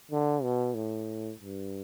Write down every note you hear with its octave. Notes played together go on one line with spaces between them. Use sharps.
D3
B2
A2
G2